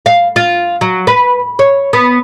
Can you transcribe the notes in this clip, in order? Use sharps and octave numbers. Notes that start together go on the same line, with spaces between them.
F5
F4
F#3
B4
C#5
B3